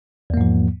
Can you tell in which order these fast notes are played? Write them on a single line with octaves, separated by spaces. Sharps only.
E2 A#3 G#2 F3